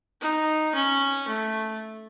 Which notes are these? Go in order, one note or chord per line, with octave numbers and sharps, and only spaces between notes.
D#4
C#4
A3